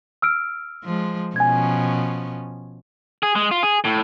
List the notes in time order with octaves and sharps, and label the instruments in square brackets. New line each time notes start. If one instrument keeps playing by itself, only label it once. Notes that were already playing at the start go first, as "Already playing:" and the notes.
[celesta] E6 F6 D7
[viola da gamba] F3 G#3
[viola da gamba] B2 F3 C#4 [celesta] G#5 G#6
[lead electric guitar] G#4
G#3
F4
G#4
A2